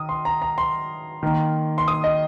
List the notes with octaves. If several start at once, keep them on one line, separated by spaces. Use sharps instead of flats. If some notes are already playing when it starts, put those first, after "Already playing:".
Already playing: D#3 D#6
C6
A#5
A#5
C6
D#3 A#3
C6
D#6
D#5